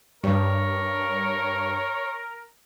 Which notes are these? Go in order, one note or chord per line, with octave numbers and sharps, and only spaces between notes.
G2 A#4 C#5